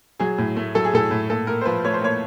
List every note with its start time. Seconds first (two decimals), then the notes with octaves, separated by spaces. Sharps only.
0.19 F#3 G#4
0.38 A2
0.57 A3
0.75 F#3 A4
0.85 G#4
0.93 A2 A4
1.11 A2
1.30 A#2 A4
1.47 A#2 A#4
1.61 C5
1.65 F3 B4
1.85 A3 C#5
1.93 C5
2.02 A#2 C#5